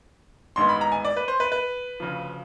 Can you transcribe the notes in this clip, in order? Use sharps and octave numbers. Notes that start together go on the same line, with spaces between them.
A1 G2 D#3 G#3 B3 C6
B5
A#5
G#5
D5
B4
C5
B4
B4
D2 C#3 F3